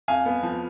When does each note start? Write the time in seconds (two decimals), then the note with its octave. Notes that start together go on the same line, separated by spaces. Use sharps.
0.08 F2 F5 G#5
0.25 B3
0.43 F3